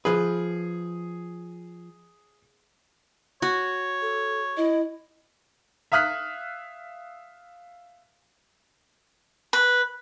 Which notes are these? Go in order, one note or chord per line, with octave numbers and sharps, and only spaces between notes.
F3 G#4 B4
F#4 C#5
A4
E4 D#5
E5 F5 D#6 F6 F#6 B6
B4